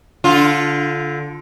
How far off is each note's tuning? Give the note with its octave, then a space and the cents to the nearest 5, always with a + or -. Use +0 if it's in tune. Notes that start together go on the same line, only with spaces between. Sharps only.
D3 -15 F4 +0